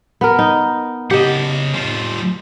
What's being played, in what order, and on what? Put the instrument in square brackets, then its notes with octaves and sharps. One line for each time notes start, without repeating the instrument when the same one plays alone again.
[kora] B3 A#4
D#4
[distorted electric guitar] C#3 F#5 [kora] G4 D#5
[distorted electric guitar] G3 F4